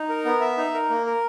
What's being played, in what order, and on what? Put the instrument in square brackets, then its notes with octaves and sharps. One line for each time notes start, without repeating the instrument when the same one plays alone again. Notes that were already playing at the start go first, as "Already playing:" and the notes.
Already playing: [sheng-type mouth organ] D#4
A#4
B3
E5
D#4
A#4
A#3
A#4